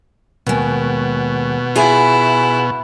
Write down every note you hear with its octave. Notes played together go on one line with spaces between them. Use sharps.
D#2 B2 G#3
E4 F4 G#4 G#5